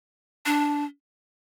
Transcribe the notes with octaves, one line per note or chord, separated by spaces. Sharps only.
D4